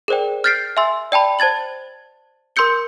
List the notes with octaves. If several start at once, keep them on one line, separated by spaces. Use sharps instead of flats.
G#4 A#4 C5 D5 G5
F6 G6 A6 B6 C7 D7
E5 G#5 C6 E6 A6
D5 G5 A5 B5
C5 A5 G#6 A6 F#7
A#4 C6 E6 G6 C#7 G7